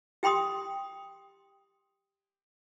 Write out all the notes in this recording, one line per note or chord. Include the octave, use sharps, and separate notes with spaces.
G4 G5 B5 C6 D#6